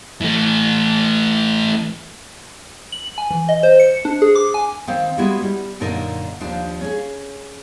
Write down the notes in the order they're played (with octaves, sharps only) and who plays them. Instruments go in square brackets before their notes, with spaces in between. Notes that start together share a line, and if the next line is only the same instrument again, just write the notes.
[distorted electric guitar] E3 A3
[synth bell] F#7
G#5
E3
D#5
C5
C#7
D4
G#4
D6
G#5
[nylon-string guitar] D#3 C4 F5
G3 G#3 B3 E4 F#4
G3
F#2 A#2 D3 D#4 A#4
D#2 F3 D4
C#4 G#4